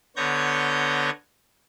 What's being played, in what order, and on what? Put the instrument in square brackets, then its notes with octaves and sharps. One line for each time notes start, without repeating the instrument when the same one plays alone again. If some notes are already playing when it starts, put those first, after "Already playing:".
[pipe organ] D3 B3 C#5 G6 G#6 A#6